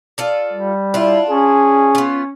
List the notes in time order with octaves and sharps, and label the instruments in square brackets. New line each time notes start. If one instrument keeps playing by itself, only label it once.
[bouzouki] F4 A4 D5
[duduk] G3
[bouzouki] D4 F4 [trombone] E4
[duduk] C#4 [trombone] G#4
[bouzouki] B3 F4